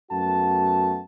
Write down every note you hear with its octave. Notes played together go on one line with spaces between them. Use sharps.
F#2 A3 B3 F#4 A5